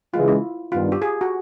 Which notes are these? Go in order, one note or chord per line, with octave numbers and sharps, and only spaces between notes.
C#3 E3 G#3 F4
E4
G2 D#3 G3 B3 D4 F4
G4
G#4
F#4